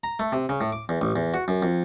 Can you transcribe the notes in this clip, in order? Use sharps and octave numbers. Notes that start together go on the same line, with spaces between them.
A#5
A3
C3
C#3
A2
D6
E2
A1
E2
F#4
F#2
F2